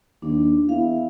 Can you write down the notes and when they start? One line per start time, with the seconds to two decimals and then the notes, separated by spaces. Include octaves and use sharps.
0.22 D#2 D4
0.69 E2 E4 F5